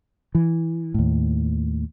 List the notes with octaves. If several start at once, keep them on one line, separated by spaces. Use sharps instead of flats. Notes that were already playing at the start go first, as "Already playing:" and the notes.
E3
D#2 A2